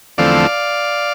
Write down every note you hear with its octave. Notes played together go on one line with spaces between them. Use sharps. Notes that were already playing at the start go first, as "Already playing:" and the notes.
E2 D3 F3 A3 C4 D5 F5